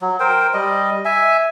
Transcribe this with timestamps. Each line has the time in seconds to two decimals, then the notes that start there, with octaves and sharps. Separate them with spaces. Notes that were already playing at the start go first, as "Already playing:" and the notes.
0.02 F#3
0.20 A#4 C5 G5
0.54 G3 D#5
1.05 E5 G#5